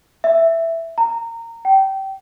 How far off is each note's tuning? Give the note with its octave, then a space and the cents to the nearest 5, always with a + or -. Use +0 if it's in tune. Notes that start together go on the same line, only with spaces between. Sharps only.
E5 +5
A#5 -20
G5 -25